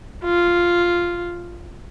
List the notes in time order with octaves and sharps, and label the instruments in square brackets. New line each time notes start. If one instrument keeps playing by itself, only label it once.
[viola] F4